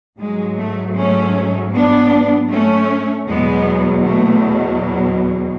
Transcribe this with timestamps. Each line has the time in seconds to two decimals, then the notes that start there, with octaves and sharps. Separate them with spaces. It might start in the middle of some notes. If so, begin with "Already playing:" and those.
0.18 G#2 F#3 G#3
0.58 A3
0.96 A3 C#4
1.74 B3 D4
2.51 A3 C#4
3.28 E2 B2 F#3 G#3 B3
4.06 A3